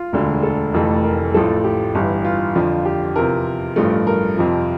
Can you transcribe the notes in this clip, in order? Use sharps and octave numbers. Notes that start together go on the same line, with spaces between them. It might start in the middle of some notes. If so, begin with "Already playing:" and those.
Already playing: F4
E1 D2 D3
A4
F1 F2 E3 A3
A#4
A1 A2 F3 A3 A4
G4
G1 G2 E3
F4
F2 D3 F3
G4
E2 C3 F3 A#4
A1 G2 F3 A3
A#4
F2 C3 F3